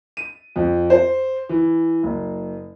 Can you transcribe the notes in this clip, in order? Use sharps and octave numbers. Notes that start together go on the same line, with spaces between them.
D#7
F2
C5
E3
F#1